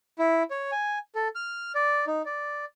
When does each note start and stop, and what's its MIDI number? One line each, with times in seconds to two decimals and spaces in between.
0.19 0.43 64
0.51 0.71 73
0.72 0.99 80
1.15 1.28 69
1.35 1.72 89
1.75 2.05 74
2.07 2.22 63
2.26 2.65 74